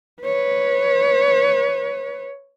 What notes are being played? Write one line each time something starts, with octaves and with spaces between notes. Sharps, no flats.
B4 C#5